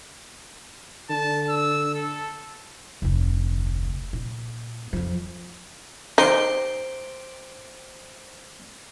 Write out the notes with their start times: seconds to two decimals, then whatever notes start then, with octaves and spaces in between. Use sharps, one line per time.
1.10 D3 A5
1.49 E6
1.95 A4
3.02 F1 D2
4.13 A#2
4.93 F2 F3
6.18 D#4 G4 C5 G5